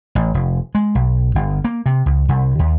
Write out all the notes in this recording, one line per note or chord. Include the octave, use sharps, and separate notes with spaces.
A1
F1
G#3
B1
G1
A#3
C3
C#2
C2
D#2